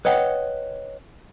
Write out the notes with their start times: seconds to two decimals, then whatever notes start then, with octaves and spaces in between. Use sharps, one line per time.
0.05 B4 C#5 D#5 F#5 G5